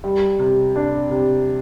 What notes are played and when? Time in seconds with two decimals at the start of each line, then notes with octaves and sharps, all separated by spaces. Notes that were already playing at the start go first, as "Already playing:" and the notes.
0.04 G3
0.39 C3
0.76 D4
1.11 C3